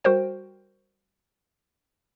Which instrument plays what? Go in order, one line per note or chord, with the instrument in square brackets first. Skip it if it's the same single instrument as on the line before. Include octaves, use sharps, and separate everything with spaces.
[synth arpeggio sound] G3 F#4 A#4 C5 G5